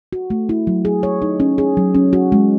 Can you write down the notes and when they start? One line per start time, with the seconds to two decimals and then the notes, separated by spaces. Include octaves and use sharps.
0.13 F#4
0.30 A3
0.49 E4
0.67 F#3
0.85 G#4
1.03 C#5
1.22 D#4
1.40 C#4
1.58 G#4
1.77 F#3
1.95 C#4
2.13 F#4
2.32 G#3